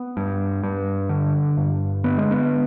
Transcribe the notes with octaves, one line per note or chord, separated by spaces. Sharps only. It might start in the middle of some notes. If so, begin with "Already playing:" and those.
Already playing: B3
G2
G2
D3
G2
D3 B3
G#3
B3